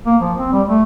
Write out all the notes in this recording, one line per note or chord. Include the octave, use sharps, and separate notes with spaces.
A#3
F3
C4
G3
A3